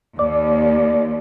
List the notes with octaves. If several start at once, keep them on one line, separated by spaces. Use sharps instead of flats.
D#2 D5